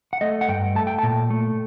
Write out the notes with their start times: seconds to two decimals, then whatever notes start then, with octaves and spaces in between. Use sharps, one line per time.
0.13 F#5
0.21 A3 D#5
0.41 F#5
0.48 G2 G5
0.75 A3 A5
0.87 G5
0.99 A#2 A5
1.30 A3